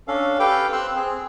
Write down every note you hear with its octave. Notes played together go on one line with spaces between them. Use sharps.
C#4 D4 A4 F5
G4 A4 B4 F5 G5 D6
C4 C6 E6 F#6
C4 G#4